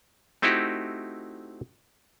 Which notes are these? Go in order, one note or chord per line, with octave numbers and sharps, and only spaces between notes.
A3 C4 D#4 E4 F#4 G4